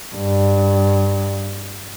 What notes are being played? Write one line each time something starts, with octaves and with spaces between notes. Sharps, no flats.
G2